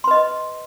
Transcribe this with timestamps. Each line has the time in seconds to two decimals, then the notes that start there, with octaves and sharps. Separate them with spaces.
0.04 C6
0.07 B4
0.11 D#5